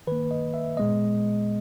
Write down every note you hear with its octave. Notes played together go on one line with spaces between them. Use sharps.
D#3 A#3 B4
D#5
E5
A#2 G#3 B3 D#5